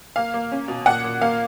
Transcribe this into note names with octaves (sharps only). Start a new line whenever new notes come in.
A#3 F5
A#3
C#4
B2
A#2 F#5
A#2
A#3 F5